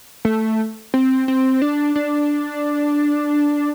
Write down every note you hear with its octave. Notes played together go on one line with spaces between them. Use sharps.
A3
C4
C4
D4
D4